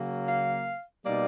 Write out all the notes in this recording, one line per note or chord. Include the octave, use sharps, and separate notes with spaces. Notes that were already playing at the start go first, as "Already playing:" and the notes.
Already playing: C#3 F#3 A#3
F5
B2 G3 A#3 D#4 D5